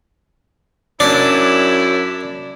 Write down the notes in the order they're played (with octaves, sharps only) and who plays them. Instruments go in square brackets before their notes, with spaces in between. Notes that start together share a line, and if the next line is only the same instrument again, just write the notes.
[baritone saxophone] F#2 [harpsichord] D4 [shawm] E4